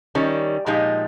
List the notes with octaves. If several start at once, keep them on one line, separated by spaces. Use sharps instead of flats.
D#3 G3 C#4
A#2 F3 G#3 D#4 G4